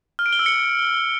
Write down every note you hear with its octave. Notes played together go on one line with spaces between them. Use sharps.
F6
D7
G7
E6
C#7